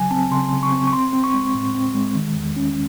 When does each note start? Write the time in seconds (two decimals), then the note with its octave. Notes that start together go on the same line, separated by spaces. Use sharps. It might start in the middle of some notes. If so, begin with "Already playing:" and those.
Already playing: C#3 F#3 G#5
0.11 C4 A5
0.31 C#3 C6
0.53 C#3
0.63 C#6
0.72 C4
0.87 C#6
0.93 C4 C6
1.13 C4
1.24 C#6
1.34 G#3
1.54 A2
1.74 C4
1.95 G#3
2.15 D#3
2.36 E2
2.56 C#4